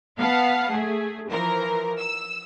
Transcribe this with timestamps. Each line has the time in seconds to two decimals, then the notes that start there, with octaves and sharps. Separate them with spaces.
0.18 B3 F5 F#5 A5 C7
0.71 A3 G#4
1.29 E3 F3 A#4
1.98 E6